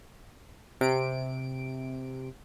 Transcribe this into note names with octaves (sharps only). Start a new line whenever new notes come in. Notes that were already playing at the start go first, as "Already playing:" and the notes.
C3 D7